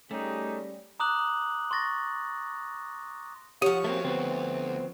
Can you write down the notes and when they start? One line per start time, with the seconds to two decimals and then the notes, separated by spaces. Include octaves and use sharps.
0.11 G3 A3 C#4 D#4 G4 G#4
1.00 A#5 D6 D#6 F#6 F#7
1.71 C6 C#6 A6 A#6
3.62 F3 G4 C#5 F#5
3.84 A3 A#3 C4 F#4 A#4
4.05 D2 B3 C4